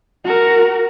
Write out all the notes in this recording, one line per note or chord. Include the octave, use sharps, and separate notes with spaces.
F#4 A#4